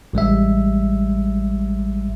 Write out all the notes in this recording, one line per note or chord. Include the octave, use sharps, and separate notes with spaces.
A1 G3 G#3 E5